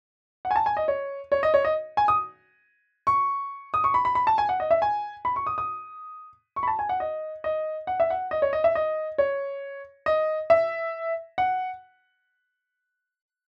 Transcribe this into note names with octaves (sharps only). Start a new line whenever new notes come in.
F#5
G#5
A5
G#5
D#5
C#5
C#5
D#5
C#5
D#5
G#5
D#6
C#6
D#6
C#6
B5
B5
B5
A5
G#5
F#5
D#5
E5
G#5
B5
C#6
D#6
D#6
C#6
B5
A5
G#5
F#5
D#5
D#5
F#5
E5
F#5
D#5
C#5
D#5
E5
D#5
C#5
D#5
E5
F#5